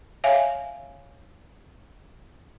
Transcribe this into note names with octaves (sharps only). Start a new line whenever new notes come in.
C#5 E5 F5 G#5